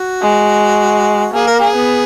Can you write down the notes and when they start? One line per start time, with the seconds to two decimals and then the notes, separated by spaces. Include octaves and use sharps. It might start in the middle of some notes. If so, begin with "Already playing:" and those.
Already playing: F#4
0.22 G#3
1.34 A#3 G#4
1.47 A#4
1.60 G#4
1.76 B3